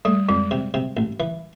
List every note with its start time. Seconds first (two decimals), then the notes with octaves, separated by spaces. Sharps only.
0.05 G3 A3
0.29 F2 G#3
0.51 C3
0.74 C3
0.97 A1
1.20 E3